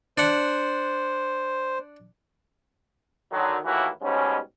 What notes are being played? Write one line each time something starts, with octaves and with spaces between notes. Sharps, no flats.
D4 C5 F#5
D3 D#3 F#3
D#2 A2 E3 A#3 E4 F#4
G#2 B2 G3 C#4